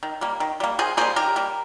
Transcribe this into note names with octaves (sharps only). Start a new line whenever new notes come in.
D#3
G3 A#3
D#3
G3 A#3
D#3 G#4 C5
G3 A#3 G#4 C5
D#3 G4 A#4
G3 A#3